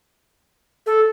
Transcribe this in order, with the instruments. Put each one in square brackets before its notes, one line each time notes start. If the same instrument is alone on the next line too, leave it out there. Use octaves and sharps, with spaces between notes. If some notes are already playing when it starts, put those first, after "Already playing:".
[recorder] A4